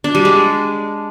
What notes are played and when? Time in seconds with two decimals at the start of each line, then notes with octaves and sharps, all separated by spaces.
0.04 D4
0.15 G3
0.25 G#3